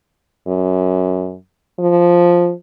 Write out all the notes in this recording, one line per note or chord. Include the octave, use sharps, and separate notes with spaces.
F#2
F3